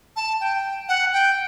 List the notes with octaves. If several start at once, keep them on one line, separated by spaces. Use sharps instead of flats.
A5
G5
F#5
G5